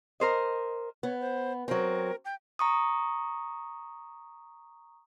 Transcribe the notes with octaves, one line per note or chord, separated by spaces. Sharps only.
A#4 C5 D#5
B3 C#5
C5
F#3 C4 A#4
G5
A#5 C#6 D#6